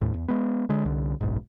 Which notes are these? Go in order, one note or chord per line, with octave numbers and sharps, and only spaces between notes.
D#2 A2
E2
G#3 B3
D3 G#3
C2 D3
F#1 B1 G#2